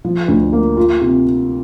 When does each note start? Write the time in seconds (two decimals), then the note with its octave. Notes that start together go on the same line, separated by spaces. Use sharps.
0.05 F3
0.28 D2
0.53 A#3
0.77 F4
1.01 C3